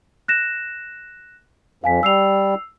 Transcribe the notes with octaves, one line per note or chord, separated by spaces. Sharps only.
F#6 A#6 E7
F2 F5 G#5 B6
G3 E6 C7 F7